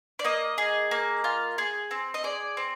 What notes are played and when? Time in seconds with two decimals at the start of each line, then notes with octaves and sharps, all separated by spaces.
0.19 D5
0.24 A#3 D#5
0.58 G#4
0.91 A#3
1.24 F4
1.58 G#4
1.91 C4
2.14 D#5
2.24 G#4 D5
2.57 C4